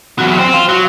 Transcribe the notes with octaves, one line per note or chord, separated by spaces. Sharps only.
E2 F#3
C4
F4
F#3